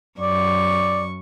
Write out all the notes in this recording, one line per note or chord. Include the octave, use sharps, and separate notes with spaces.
F#2 D5 C#6